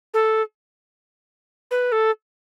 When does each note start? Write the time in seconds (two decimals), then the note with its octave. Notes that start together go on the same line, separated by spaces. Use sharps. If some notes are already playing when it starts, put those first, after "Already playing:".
0.14 A4
1.71 B4
1.92 A4